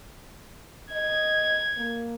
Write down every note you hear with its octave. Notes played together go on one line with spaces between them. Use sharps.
D#5 G#6
A#3